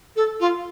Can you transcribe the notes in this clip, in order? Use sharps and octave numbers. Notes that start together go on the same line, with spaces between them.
A4
F4